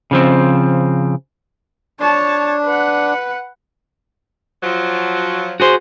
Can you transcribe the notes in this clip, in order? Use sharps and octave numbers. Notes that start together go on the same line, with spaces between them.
C#3 F3 C4
D4 C#5 A5
B4 F#5
F3 F#3
F#4 G#4 C5